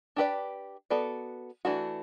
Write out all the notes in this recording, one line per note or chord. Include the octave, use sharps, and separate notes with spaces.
D4 G4 B4 D5
B3 F#4 A4 D5
E3 A3 D4 F#4